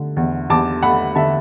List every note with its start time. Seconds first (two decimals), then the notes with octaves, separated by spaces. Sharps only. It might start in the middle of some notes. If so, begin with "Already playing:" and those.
Already playing: D3 A3
0.17 E2
0.50 E2 A5 D6
0.83 A3 F#5 B5
1.15 D3 E5 A5